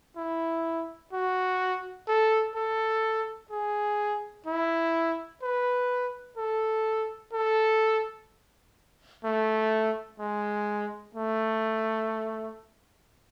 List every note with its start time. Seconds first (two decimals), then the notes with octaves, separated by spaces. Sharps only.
0.17 E4
1.13 F#4
2.08 A4
2.56 A4
3.51 G#4
4.47 E4
5.43 B4
6.38 A4
7.33 A4
9.24 A3
10.20 G#3
11.15 A3